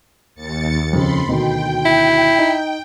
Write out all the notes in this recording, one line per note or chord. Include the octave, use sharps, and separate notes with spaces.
D#2 A6 C#7
F2 C#3 B5 C6
D2 B2 D#3 G5
E4
D#4